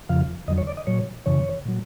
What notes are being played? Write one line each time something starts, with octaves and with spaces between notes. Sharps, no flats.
F2 C#3 F3 F5
F2 D3 F#3 D#5
C#5
D5
D#5
A#2 F#3 C#5
F#2 C#3 E3 C#5
A#2 F#3